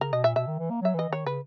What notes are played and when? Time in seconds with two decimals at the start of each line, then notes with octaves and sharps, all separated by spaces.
0.01 C#3 A#4
0.13 B2 D#5
0.24 A#2 E5
0.36 B2 E5
0.47 D#3
0.59 E3
0.70 A#3
0.82 F#3 E5
0.94 E3 D#5
1.09 D#3 C#5
1.26 C#3 B4